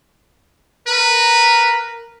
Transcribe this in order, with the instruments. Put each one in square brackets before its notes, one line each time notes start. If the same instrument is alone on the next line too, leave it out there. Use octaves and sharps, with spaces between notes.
[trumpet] A#4 [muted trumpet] B4